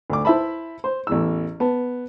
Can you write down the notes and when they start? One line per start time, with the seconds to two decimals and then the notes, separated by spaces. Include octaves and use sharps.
0.10 D2 D6
0.25 E4 C5 E5 A5 B5
0.84 C5
1.07 A1 E2 E6
1.60 B3 A5